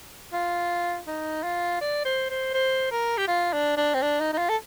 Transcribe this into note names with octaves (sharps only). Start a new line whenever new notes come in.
F4
D#4
F4
D5
C5
C5
C5
A#4
G4
F4
D4
D4
C4
D4
D#4
D#4
F4
A4